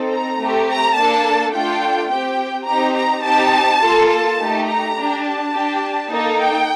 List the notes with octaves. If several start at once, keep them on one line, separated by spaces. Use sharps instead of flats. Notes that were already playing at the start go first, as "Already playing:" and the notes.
Already playing: C4 D#4 A4
A#5
A3 C4 G4
A#5
A#3 D4 A4 A5
A3 D4 F4 A4 G5
C4 G4 G5
C4 D#4 G4 A#5
A#5
C4 D#4 G4 A5
A#3 F4 A4
A5
A3 D#4 G4
A#5
D4 G4
A5
D4 G4
A#3 D#4 A4
G5